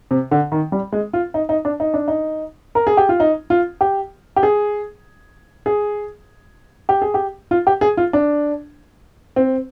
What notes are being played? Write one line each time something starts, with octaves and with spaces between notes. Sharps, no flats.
C3
D3
D#3
G3
G#3
F4
D#4
D#4
D4
D#4
D4
D#4
A#4
G#4
G4
F4
D#4
F4
G4
G4
G#4
G#4
G4
G#4
G4
F4
G4
G#4
F4
D4
C4